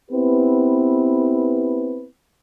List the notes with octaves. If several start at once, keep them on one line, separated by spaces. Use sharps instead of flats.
B3 C4 E4 G4 B4